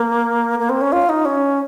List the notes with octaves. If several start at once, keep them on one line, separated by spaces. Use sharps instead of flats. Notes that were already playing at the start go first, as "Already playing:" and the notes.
Already playing: A#3
A#3
C4
C#4
F4
D#4
C#4